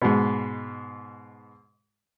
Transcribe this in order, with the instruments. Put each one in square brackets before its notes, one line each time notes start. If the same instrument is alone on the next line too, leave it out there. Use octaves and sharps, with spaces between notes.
[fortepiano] G#2 B2